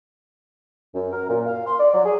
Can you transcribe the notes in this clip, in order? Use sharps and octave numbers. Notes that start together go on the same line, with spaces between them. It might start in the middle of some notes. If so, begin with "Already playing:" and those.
F#2
A#4
A#2
F5
C6
D5
F#3
G#4